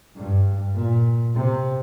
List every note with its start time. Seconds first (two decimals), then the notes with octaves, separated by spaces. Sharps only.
0.17 G2
0.75 A#2
1.36 C3